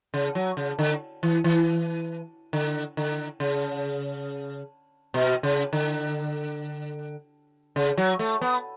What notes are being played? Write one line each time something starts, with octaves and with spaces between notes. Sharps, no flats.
C#3
F#3
C#3
D3
E3
E3
D3
D3
C#3
B2
C#3
D3
C#3
F#3
A3
B3